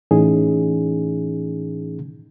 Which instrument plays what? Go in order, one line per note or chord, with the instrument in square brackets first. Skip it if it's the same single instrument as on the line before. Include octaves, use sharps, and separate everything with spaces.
[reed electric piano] A2 E3 C#4 D#4 G#4